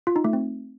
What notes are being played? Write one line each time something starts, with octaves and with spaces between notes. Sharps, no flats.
F4
D#4
A3
C4